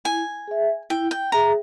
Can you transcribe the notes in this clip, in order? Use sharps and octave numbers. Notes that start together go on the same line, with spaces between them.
E4 G#5
G#4 E5
E4 G5
G5
G#4 E5 A#5